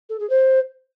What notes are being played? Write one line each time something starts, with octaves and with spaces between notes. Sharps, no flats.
A4
G#4
C5